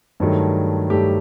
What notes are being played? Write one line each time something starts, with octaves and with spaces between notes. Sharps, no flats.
G2 D#3 F#3 A3
G2 D#3 F#3 A3 G4